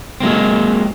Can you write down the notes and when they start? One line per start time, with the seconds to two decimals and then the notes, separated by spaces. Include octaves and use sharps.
0.20 F#3 G#3 A#3 C4